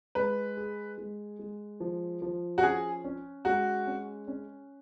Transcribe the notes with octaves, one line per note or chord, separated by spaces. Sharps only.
G#3 B4
G#4
G#3
G#3
F3
F3
F#4
C#4 G#4
C#4
G#3 F#4
C#4
C#4